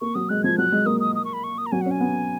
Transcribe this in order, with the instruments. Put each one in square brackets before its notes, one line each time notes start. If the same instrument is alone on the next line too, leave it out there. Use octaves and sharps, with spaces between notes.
[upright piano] A#3 [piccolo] C#6
[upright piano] F#3 [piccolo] D#6
[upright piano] G#3 [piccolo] F#6
[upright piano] F3 [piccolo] G#6
[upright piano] F#3 [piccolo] F#6
[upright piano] G#3
[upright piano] A#3 [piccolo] D#6
[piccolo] D#6
D#6
C#6
B5
C#6
D#6
A#5
[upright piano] F#3 [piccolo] G#5
[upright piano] C#4 [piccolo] F#5
[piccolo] G#5
[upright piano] B3